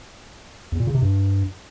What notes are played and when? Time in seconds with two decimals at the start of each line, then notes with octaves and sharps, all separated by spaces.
0.72 E2
0.80 A#2
0.87 C#3
0.95 C3
1.02 G2